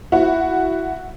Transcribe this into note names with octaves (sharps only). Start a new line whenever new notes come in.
E4 F#4